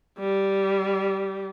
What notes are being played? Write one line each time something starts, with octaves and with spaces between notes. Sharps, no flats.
G3